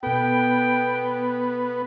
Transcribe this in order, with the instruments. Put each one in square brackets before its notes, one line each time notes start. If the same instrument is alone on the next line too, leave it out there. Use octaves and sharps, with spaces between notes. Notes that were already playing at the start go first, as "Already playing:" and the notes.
[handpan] B2 A4 [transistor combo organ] B3 [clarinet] G5